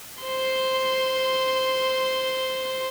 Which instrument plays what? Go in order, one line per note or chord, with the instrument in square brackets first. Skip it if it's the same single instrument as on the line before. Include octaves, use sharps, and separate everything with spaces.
[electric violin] C5 C6